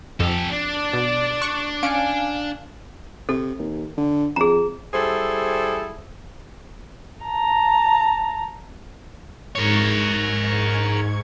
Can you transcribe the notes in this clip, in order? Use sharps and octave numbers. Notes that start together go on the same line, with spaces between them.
F2 G4 A4
D4 D5
B2
C#6 F#6
C#4 F5 G#5 C#7 D7
C3 A4
D#2
D3
F2 G#4 A#5
G3 E4 G#4 A4 C5
A5 A#5
G#2 A#4 C#5 C#6 G#6